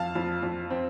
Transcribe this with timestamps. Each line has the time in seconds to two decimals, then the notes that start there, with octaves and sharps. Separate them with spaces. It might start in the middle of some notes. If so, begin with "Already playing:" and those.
Already playing: F2 F5 A5
0.15 F2
0.43 F2
0.70 C4